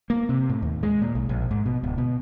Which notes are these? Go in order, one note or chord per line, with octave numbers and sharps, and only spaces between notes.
A#3
C3
A2
D#2
G#3
A#2
B1
A#1
G#2
B2
D1
B2